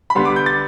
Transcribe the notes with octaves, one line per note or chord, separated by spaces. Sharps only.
B5
D3 G3 B3 C6
D6
G6
A6